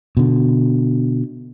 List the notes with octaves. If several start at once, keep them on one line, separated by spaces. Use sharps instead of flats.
B2 D3